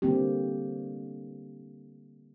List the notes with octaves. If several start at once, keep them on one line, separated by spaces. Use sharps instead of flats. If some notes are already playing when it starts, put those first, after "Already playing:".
D3 G3 A#3 C4 G4